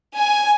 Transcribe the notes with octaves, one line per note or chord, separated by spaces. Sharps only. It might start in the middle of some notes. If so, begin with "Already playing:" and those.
G#5